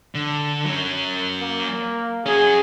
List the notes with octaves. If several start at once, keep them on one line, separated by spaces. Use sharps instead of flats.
D3
F#3 C#4
A#3
C#4 F#4 G#4